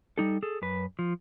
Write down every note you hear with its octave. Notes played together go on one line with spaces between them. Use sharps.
G3 D#4 A4
G#4 A4
F#2 B4
F3